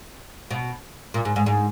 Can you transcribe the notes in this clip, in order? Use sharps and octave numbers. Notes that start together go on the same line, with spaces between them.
B2
A#2
G#2
G#2
G#2